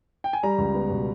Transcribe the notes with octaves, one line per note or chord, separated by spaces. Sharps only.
G5
G#5
G3 A#5
C#2
B3
B2